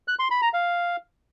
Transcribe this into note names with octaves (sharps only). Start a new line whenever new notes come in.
F#6
C6
B5
A#5
F5